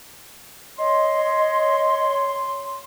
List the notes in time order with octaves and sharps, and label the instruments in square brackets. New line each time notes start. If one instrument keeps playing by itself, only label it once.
[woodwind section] C#5 C6 [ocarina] D#5